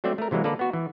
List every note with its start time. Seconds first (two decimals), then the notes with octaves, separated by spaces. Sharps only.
0.04 F#3 A3 C4 D4 D5 E5
0.18 A3 A#4
0.31 C3 E3 F#3 G#3 A#3
0.44 D3 A#3 A4 B4 D5
0.59 B3 F#4
0.73 E3